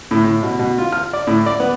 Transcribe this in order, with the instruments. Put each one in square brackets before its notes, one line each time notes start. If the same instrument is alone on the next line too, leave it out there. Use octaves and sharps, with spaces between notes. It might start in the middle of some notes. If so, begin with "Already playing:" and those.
[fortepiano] A2
A2
B2
B2
F4
F6
D5
A2
D5
B3